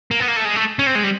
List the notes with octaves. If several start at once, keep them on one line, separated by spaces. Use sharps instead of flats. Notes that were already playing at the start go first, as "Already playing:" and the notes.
A#3
B3
A#3
A3
G#3
A3
C#4
C4
G#3
G3